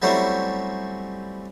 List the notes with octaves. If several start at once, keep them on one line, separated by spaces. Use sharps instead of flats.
F#3 G3 A3 C4 C#4 E4